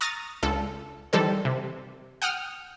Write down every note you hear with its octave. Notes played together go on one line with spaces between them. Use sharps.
A#5 C#6 D#6 F6 A6 A#6
C#2 D4 A4
D#3 E3 G3 A4 C5
C3
F#5 G5 D#6 F6